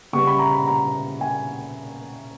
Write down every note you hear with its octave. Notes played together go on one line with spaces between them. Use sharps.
C#3 G3 B3 C#6
B5
A#5
B5
A#5
G#5